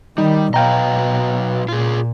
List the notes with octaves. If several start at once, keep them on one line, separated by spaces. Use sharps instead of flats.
D#3 G3 D#4
B2 F#3 B4 D#5 F5 G5 A#5
A#2 F4 G#4